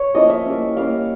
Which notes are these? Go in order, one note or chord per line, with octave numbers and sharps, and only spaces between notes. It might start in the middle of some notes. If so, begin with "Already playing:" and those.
Already playing: C#5
F3 A#3 C#4 E4 D#5
E5
G3 A#3 C#4
G3 A#3 C#4 F5